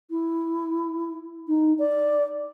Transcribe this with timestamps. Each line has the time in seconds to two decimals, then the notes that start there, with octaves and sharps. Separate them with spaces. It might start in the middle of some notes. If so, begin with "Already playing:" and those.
0.10 E4
1.48 D#4
1.78 D5